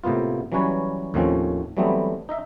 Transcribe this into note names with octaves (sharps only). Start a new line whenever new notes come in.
A2 C3 A#3 B3 F4
E3 F#3 G3 C#4 B4 C#5
D#2 A2 D#3 F3 C4 C#4
E3 F#3 G3 A3 B3 C4
D#4 D#5 E5